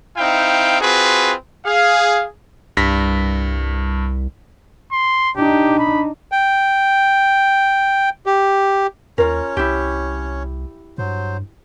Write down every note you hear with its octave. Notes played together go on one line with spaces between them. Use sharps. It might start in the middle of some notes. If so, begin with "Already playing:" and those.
C4 D#4 E4 F5 G5
C4 F4 F#4 G#4 B4
G#4 F5
C2 G2 A#6 B6
C6
D4 D#4 G4
B5
G5
G4
D#2 C#4 F4 A#4 C#5
C2 E4 G4
G2 F#3 C5